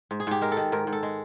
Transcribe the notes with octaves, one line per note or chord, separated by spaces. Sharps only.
G#2
G#4
G#2 G4
G#3 A#4
A4
D#3
G#2 A#4
G#2
A4
G#3